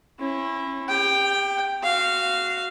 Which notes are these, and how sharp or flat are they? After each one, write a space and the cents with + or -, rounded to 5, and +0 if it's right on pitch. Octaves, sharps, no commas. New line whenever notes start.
C#4 -35 E4 +10
G4 +35 G5 +0
F#4 +0 F5 -15